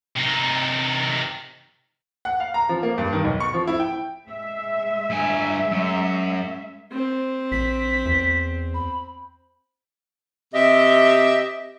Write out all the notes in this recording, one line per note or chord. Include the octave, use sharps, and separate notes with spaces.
C3 D#4
F#5
F5
A#5
F3
A#3
G2
D#3
B1
C#6
F3
E4
G5
G#3 E5
G2 G#5
F#2
C4
A#1 B6
E2
B5
C3 G4 D#5 E5